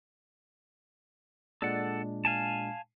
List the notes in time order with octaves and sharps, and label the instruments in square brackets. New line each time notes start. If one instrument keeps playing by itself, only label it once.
[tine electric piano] A#2 G#3 D4 [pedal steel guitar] A4 D5 F#5
[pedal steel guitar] F5 G#5 A5